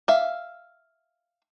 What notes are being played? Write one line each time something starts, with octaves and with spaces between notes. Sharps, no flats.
E5 F5